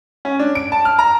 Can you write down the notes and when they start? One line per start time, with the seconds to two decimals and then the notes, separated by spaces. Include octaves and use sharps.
0.25 C#4
0.39 D4
0.55 D7
0.72 A5
0.85 F6
0.99 A#5